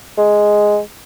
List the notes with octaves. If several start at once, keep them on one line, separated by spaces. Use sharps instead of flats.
G#3